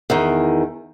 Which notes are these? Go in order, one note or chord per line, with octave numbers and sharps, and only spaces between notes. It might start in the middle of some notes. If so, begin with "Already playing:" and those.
E2 D#3